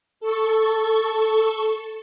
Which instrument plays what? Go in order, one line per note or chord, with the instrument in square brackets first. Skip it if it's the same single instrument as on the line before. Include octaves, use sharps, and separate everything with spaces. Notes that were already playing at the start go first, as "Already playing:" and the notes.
[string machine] A4 C#6